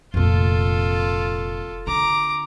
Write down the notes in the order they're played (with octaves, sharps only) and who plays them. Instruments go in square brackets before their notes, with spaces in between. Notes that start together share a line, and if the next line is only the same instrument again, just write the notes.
[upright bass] F1 A#2 [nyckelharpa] F4 A4
[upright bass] D3 [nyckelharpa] A#5 D6